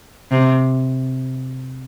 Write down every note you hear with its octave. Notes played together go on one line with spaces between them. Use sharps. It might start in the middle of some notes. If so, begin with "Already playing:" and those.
C3